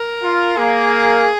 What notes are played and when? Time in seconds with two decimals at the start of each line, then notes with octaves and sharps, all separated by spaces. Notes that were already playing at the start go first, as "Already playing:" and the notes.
Already playing: A#4
0.22 F4
0.56 A#3 G#4